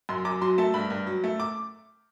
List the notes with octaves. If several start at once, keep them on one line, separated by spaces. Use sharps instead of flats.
F#2 C6
F#2 D6
F#3 C6
A3 A5
G2 B5
G2
F#3
A3
D6